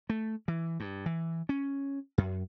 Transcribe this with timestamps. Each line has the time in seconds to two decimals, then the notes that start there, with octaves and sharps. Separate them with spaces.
0.09 A3
0.48 E3
0.80 G2
1.06 E3
1.49 C#4
2.18 F#2